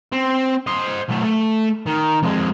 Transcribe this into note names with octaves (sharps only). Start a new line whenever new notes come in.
C4
C5 D#5
B1 A3
A3
D#3
F2 G#3